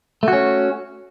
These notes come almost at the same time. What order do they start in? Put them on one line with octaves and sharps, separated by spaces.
A3 F#4 C#4